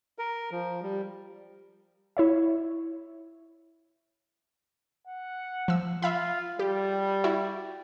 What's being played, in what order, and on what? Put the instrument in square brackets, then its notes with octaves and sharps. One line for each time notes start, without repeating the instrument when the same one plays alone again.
[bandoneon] A#4
F3
G3
[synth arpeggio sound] E4 C#5 E5
[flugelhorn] F#5
[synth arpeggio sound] F3 E6
[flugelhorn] F4 [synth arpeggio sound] E5 F5 B5
[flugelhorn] G3 [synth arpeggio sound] G4
[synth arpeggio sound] E4 F#4